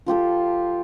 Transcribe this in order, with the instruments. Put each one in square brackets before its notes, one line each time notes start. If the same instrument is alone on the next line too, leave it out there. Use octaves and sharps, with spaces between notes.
[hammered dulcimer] F3 F4 G4 A4